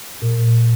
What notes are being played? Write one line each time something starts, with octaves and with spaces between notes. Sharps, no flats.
A#2